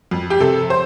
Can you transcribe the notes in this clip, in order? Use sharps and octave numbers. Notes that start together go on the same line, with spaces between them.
F2
G4
C3 A4
C5